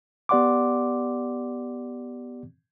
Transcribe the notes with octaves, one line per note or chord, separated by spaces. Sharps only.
B3 G4 D5 F#5 C6 D6